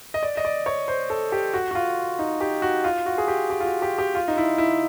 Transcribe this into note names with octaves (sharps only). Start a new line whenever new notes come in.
D#5
D5
D#5
D5
C#5
C5
A4
G4
F#4
F#4
F4
D#4
G4
F#4
F4
F#4
G#4
G4
G4
F4
F#4
G4
G4
F4
D#4
E4
E4